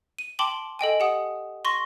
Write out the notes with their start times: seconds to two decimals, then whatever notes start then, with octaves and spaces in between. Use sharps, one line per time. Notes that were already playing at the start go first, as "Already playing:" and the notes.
0.19 D#7
0.39 G5 A5 C6 D6 F#7 G7
0.79 A4 D#5 G5 G#5
1.00 G4 F#5 D#6
1.65 C6 C#6 A#6